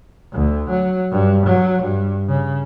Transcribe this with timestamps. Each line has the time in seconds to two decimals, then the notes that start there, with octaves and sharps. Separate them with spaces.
0.33 D2
0.70 F#3
1.12 G2
1.47 F#3
1.83 G2
2.28 C#3